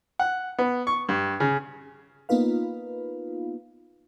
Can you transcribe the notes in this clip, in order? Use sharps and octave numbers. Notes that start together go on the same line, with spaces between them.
F#5
B3
C#6
G2
C#3
A#3 B3 D#4 F4 B4 F5